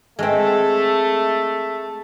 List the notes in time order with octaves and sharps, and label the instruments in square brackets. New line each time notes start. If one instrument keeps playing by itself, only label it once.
[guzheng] G#3 C4 [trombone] A3